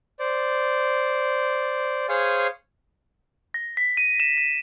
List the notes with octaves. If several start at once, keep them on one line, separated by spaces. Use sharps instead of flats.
C5 D5
G#4 C5 C#5 F5 G#5
A#6
B6
D#7
E7
D#7